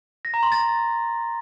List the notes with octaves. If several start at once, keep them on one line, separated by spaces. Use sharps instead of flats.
A#6
A#5
C6
A6